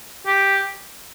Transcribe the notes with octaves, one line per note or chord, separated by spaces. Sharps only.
G4